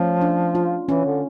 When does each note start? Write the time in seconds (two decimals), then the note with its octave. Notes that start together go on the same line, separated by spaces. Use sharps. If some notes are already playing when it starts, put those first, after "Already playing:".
Already playing: F3 A3 C#4
0.21 D4
0.55 F4
0.89 E3 C#4
1.05 D3